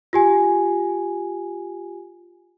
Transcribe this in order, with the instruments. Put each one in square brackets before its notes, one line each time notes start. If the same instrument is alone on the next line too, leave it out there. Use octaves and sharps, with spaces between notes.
[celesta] F4 G4 G#5